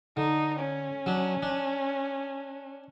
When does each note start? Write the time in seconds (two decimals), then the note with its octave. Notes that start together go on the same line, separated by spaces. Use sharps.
0.17 D3 D#4
0.59 C#4
1.06 F#3 D4
1.43 D4